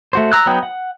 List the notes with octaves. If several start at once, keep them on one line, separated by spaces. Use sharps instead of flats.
A3 F#4 C5
A#5 E6 F#6
F#3 B3 D#4 G5
F#5